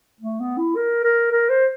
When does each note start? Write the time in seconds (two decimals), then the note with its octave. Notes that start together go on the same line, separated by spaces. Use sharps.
0.21 A3
0.40 B3
0.58 E4
0.76 A#4
1.04 A#4
1.32 A#4
1.49 C5